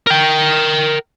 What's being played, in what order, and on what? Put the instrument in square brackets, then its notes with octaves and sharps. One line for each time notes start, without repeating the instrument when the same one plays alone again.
[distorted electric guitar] A#4 G5